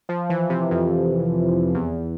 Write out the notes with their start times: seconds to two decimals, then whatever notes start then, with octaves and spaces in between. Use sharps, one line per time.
0.09 F3
0.30 E3
0.50 C3
0.71 F2
1.74 E2